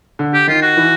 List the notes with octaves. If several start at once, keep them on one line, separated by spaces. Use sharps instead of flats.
D3
G4
D#3 F4
F#4
E3